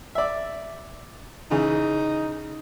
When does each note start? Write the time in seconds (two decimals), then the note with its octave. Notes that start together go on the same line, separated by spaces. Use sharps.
0.15 D5 E5
1.51 C#3 E3 D#4